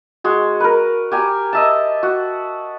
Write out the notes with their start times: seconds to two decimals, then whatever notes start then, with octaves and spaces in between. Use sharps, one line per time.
0.24 G#3 F#4
0.60 A#4 B4
1.12 G4 G#5 A#5
1.53 D#5 E5 A5
2.03 F#4